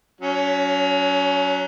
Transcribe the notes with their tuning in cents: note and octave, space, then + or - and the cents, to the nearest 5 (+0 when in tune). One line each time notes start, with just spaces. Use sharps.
F#3 +0 C#4 +30